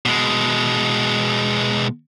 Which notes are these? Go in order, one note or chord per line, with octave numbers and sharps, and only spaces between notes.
B2 G#3